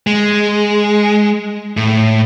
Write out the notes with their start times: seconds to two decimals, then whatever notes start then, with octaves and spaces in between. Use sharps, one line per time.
0.07 G#3
1.77 A2